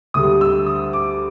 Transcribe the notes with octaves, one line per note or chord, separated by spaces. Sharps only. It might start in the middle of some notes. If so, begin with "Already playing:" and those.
D2 D3 G3 D#6
E6
D#6
D6